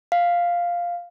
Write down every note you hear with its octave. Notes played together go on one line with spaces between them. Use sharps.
F5